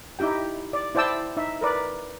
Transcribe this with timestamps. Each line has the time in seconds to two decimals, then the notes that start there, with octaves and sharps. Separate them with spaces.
0.19 D#4 E4 G4 G5
0.73 D5
0.95 E4 C5 D5 G5 A5 E6
1.37 D#4 E5
1.61 A#4 B4 D5